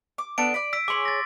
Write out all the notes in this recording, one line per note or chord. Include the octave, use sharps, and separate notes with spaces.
D6
B3 D4 A4 D7
D5 B5
E6 B6 D7
G#4 C#5 C6 D6
A6 A#6